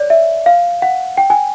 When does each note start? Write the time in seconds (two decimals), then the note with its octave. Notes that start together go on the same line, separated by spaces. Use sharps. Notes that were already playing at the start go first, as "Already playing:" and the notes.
Already playing: C#5 D5
0.10 E5
0.46 F5
0.82 F#5
1.17 G5
1.30 G#5